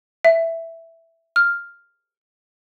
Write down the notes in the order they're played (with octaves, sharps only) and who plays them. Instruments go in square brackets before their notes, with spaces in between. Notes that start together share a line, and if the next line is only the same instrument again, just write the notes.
[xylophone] E5
F6